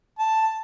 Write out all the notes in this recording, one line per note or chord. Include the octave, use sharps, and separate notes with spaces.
A5